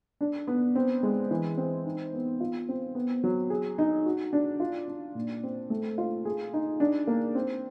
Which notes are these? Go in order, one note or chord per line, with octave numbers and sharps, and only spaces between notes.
D4
B3
C4
G#3
E3
C4
D#4
B3
F4
C4
B3
F#3
G#4
D#4
F#4
D4
F4
D4
A#2
C4
A3
F4
G#4
D#4
D4
A#3
C4